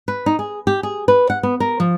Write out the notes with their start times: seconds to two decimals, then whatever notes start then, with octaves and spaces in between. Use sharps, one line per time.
0.08 B4
0.26 D#4
0.39 G#4
0.67 G4
0.83 G#4
1.08 B4
1.30 F#5
1.43 B3
1.60 A#4
1.80 F3